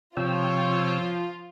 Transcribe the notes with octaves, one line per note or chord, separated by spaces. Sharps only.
C3 F3 F4 C#5 G5 E6